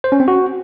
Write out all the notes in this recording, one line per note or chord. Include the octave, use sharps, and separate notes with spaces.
C5
C#4
C4
F#4